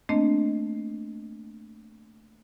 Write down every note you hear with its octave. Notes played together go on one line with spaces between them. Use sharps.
A3 A#3 C4 D4 D#5